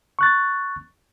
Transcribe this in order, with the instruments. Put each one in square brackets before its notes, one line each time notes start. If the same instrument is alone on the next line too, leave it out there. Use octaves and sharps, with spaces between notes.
[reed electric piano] C#6 F#6 A6